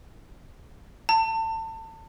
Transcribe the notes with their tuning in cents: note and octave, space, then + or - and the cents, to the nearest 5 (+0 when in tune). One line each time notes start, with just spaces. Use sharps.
A5 +30